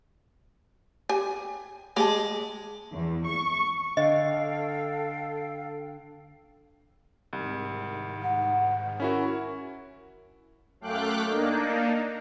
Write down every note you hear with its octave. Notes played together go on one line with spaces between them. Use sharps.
G4 G#5
G#3 G4 A5
E2
C#6
D3 A4 D#5 F5 G5
C2 G#2 D#3
F#5
C#4 E4 F#4 A#4
F#2 A3 F5 G5 D6 F#6
A#3 D4 D#4